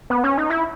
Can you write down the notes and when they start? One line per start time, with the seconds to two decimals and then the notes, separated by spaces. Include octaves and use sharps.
0.10 B3
0.24 C#4
0.37 D#4
0.50 E4